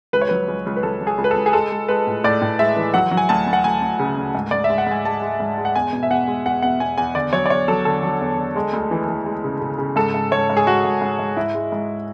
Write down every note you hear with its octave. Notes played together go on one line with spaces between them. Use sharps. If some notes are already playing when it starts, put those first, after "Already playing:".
C#2 B4
C#5
F#3 B4
C#2
C#2
B4
C#2 A4
C#2
G#4
C#2
B4
C#2 A4
G#4
G#3 A4
G#3
G#3 B4
A2
A2 D5
A2
G#3 E5
E3
F#3 F#5
F#3
G#5
D2 A5
D2
F#5
D2 G#5
D2
C#3
D2
G#2
G#2 D5
E5
G#3
F#5
G#2 G#5
G#3 A5
G#3
G#2
G#3
F#5
E2 G#5
B2
E5
E2 F#5
G#3
E2 F#5
B2 F#5
E2 G#5
E2 G#5
D3 D5
F#3 C#5
D5
E2 C#5
F#3 A4
D3 A4
F#3
E2
D3
G#3
D2
E3
E3
G#3
C#3
C#3
C#3
G#2 A4
G#2
G#2 C#5
G#2
G#4
G#2 F#4
G#2
G#2
G#2
G#2 E4
G#3
G#2